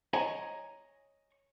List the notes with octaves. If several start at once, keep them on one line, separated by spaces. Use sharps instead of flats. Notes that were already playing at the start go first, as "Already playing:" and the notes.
C#5 D#5 G#5 A#5